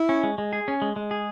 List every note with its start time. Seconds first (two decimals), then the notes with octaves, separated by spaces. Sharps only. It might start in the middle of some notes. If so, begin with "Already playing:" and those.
Already playing: E4
0.09 C#4
0.23 G#3
0.38 G#3
0.53 G#4
0.68 C#4
0.82 G#3
0.96 G#3
1.11 G#4